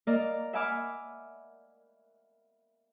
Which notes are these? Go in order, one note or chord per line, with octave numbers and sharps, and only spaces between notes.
A#3 A#4 D5 D#5
E5 F#5 G#5 B5 D6 F6